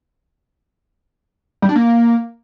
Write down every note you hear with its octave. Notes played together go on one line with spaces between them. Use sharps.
G3
D4
A#3